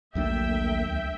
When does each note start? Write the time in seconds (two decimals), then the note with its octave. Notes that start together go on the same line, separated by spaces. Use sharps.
0.15 A#1 D#2 F#3 A3 A#3 D4 E5 G5
0.87 C#2